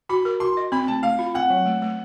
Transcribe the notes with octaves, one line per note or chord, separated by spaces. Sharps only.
F#4 B5
A#4
F#4 C6
D#5
C4 B5
A3 A5
A3 F5
F4
C4 F#5
F#3
A3
A3